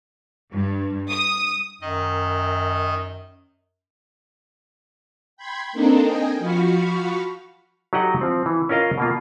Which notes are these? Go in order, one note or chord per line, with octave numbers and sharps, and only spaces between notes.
G2
D#6
F#2 D#3 D#5
G5 B5 C6 G#6
A#3 C4 D4 D#4 A4 A#4
D#5 G5 G#5
F3 F#4 F5 B5 C#6
F#3 D#4 G4 A4 D#5 F#5
F3 C4
E3
C#4 F4 A#4 D#5 F5
B2 A#3 F4